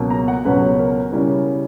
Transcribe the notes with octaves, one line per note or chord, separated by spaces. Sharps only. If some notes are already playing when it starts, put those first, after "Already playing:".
Already playing: C#2 B2 F#3 A#3
A#5
F#5
C#2 B2 F#3 C#4 B4
A#4
C#3 G3 C#4 E4 A#4